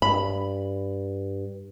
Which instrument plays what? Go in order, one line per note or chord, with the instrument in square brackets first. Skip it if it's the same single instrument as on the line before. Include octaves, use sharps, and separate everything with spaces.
[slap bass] G2 [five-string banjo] B5